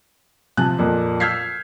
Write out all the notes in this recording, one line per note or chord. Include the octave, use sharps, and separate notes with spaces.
C3 F3 G#5 A5 F#6
F2 A#2 A#3
E6 F6 G6 G#6 B6 C7